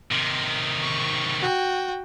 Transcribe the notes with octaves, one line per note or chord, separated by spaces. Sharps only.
C3 D#3
C#6
F#4 G5